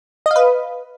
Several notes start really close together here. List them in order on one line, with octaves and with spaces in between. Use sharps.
D#5 F5 B4